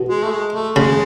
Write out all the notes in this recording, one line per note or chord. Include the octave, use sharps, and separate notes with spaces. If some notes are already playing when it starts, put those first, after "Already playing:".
Already playing: B2
G#3
A3
G#3
A3
C#3 G#3